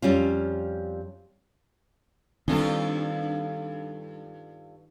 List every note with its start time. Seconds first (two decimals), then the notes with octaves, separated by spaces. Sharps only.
0.02 F2 G3 C#4 F4
2.48 G2 D#3 G3 C4 D4 F4 A4